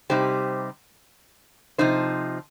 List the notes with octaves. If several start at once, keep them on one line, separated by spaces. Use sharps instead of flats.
C3 G3 D#4 G4 C5
C3 F3 D#4 C5